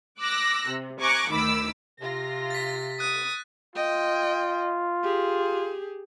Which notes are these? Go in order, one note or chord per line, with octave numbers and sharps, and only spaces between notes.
D6 E6 F#6 A#6
C3
G#5 A#5 C#6 D6 F#6
D2 D#3 B5 D6 E6
C3 F4 A#6
A6 B6
D#6 F#6
F4 D#5 G5
G4 G#4